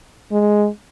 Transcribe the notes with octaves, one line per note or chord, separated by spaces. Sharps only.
G#3